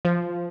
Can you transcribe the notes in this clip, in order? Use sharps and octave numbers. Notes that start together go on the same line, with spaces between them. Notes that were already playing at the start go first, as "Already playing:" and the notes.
F3